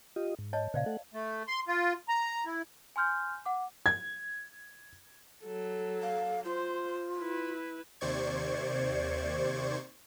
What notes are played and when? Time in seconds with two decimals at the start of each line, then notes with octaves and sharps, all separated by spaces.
0.16 F4 G4 D#5
0.39 G#2
0.53 C#5 D#5 A5
0.74 A#2 C#3 C5 D5 F5
0.86 A3 A4 F#5
1.14 A3
1.48 C6
1.68 F4
2.08 A#5
2.46 E4
2.96 G#5 C6 F6 G6
3.46 F#5 D6
3.86 G#6
5.44 F#3 A4
6.02 F5
6.45 F4 C5
7.18 E4 B4
8.01 D#2 C3 C5 D5 C#6 G#6